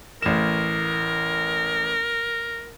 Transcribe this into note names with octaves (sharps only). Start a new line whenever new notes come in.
A1 A#4 E7